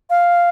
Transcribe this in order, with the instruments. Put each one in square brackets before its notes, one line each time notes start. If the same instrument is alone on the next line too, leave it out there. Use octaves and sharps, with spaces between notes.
[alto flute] F5